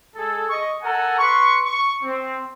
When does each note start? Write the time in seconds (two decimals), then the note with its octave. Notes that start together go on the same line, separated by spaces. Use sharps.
0.15 G#3 G#4 A4
0.50 D#5 C#6
0.82 A4 A#4 F#5 G#5 A#5
1.18 B4 C6 C#6
1.65 C#6
2.03 C4